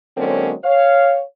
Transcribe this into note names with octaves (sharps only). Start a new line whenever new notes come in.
D3 F#3 G#3 A#3 C4 C#4
C#5 F5